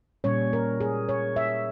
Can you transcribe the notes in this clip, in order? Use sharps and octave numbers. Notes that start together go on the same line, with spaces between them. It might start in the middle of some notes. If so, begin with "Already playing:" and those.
A#2 G3 C#4 C#5
A#4
G#4
C#5
E5